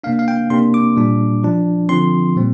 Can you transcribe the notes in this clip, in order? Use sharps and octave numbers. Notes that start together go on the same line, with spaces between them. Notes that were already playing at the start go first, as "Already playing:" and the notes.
C3 A#3 D4 F5
F5
G5
C3 A#3 D4 C6
D6
A#2 G3 D4
F3 D4
D3 F3 C4 C6
A#2 G3 C4